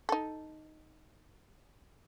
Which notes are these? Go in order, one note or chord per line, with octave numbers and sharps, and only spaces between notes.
D#4 A4